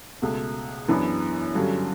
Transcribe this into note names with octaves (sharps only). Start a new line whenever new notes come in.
C#2 B2 A3
F#2 E3 B3 D4
G2 D3 F#3 C#4